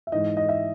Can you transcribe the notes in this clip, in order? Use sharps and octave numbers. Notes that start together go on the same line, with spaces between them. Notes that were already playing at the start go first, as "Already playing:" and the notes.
E5
G#2 E3 G#3 D#5
D#5
E5